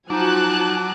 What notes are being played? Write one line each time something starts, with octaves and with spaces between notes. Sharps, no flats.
F3 F#3 D#4 F#4 G#5 A5 D6 F#6